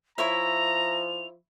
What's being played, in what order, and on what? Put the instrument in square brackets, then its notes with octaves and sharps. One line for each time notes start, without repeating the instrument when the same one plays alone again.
[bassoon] F3 [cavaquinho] E4 C#5 E5 [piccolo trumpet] A#5 [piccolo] F7